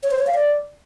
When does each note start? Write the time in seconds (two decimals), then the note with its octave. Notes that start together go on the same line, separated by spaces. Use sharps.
0.03 C#5
0.11 C5
0.19 C#5
0.27 F5
0.35 D5